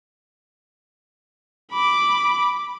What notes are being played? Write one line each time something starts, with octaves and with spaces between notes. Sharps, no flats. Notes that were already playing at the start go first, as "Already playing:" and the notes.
B5 D6